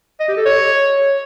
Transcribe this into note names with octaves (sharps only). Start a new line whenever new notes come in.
D#5
G4
A4
C#5